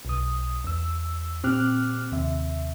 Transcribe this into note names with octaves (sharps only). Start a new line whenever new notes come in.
B1 D#6
E2 E6
A#2 C4 G4 D6 F6 F#6
D#2 C3 E5